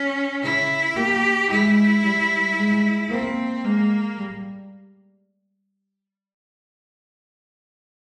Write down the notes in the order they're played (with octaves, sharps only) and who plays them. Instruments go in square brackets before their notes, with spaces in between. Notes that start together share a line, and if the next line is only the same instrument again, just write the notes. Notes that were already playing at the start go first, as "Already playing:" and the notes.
Already playing: [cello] C#4
[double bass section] C#3 [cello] E4
[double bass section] A#3 [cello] G4
[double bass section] G#3 [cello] E4
[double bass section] G3
G#3
[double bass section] A#3 [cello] C4
[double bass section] G#3 [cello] A#3
[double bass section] G3